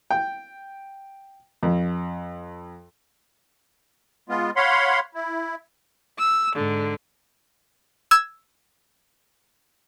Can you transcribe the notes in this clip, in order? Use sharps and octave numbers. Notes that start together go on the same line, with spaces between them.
G5
F2
G#3 B3 F4
C#5 F5 F#5 B5 C6
E4
E6
G#2 D3
E6 G#6 E7